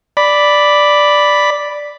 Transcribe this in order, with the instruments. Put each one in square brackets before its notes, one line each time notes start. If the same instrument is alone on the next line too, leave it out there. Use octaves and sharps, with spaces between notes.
[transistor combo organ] D5 B5